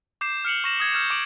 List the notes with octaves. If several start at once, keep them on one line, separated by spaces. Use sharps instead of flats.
D6 G6 C7 E7
F6 C7 C#7 F7 F#7
C#6 A#6 E7 F#7
D#6 G#6
E6 F6 G6 C#7 E7
D6 D7 F#7